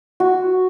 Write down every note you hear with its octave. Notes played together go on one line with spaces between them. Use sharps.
F#4